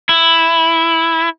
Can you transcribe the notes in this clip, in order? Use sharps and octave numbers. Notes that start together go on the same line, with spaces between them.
E4